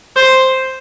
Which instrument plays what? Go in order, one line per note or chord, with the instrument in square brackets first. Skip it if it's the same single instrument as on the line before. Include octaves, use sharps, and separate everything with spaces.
[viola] C5